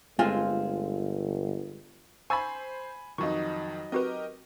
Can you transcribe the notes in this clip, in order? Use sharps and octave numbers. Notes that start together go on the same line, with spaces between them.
G1 G#3 A3 C4 F4 G#5
C5 G#5 B5 C#6 E6 A6
F2 D#3 F#3 D#4 C#6
C4 F#4 G4 A#4 B4 D#5